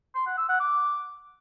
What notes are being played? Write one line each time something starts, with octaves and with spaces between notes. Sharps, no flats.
C6
F#5
E6
F#5
D6